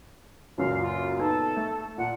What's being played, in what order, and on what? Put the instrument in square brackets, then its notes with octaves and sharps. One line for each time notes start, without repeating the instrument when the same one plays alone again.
[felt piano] C#2 F#2 A#2 [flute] F5
[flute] F4
[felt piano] B3 D#4 [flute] A4
[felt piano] A3
[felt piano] A#2 [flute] F#5